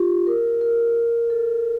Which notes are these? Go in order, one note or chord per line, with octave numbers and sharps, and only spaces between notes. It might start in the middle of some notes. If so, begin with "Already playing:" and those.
Already playing: F4 G4
A#4
A#4
A4